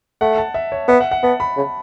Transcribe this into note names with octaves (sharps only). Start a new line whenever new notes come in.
A3 F#5
A5
E5
C#5
B3 E5
F#5
F#5
B3 A5
B5
C#3